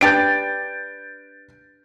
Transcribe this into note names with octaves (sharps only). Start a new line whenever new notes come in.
D4 G4 B4 G6 A6 D7